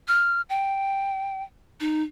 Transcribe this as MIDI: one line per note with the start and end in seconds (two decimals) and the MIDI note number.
0.08 0.42 89
0.50 1.43 79
1.80 2.02 63